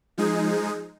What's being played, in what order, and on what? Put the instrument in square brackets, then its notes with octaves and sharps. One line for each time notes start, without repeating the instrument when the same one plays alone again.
[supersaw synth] F3 G#3 D#4 G#4